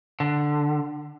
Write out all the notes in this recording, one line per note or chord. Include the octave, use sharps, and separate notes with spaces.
D3